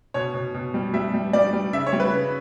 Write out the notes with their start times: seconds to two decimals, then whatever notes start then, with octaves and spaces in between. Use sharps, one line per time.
0.14 B2 C#5
0.34 B2
0.55 B2
0.74 G3
0.94 G3 E5
1.14 G3
1.33 G3 D5
1.53 G3
1.73 C#3 E5
1.87 C#5
1.93 G3
2.00 B4
2.13 C#3